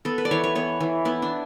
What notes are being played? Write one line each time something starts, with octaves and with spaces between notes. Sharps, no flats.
B3 A4
B4
D5
E3 C#5
C#5
B3 C#5
E3
B3 E4
D4